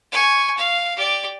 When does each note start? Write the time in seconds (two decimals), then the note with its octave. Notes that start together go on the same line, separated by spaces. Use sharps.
0.12 G#5 C#6
0.58 F5
0.96 G4 D5